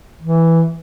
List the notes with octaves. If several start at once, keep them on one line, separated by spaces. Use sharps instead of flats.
E3